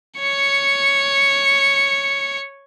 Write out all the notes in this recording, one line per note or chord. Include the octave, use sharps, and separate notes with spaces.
C#5 C#7